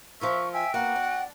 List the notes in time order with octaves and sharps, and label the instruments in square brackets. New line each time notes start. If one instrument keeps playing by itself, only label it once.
[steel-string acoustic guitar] F3 F4 A#4 [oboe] E5 [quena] C#6
[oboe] E5 [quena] G5 [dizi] G#5
[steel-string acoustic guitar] A#3 B3 [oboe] F#4 [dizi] F#5
[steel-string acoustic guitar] D4